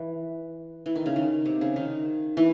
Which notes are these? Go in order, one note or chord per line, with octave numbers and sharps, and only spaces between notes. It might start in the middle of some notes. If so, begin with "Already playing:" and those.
Already playing: E3
E3
D#3
C#3
D#3
C3
C#3
D#3
E3